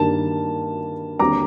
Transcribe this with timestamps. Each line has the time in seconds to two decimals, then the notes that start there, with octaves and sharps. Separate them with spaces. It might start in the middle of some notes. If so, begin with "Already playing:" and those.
Already playing: G2 D#3 G3 A#3 A5
1.19 D#2 D3 G3 C4 A#5 D6